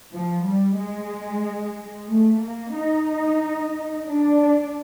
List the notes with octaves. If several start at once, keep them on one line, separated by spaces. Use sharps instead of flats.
F3
G3
G#3
A3
A#3
D#4
D4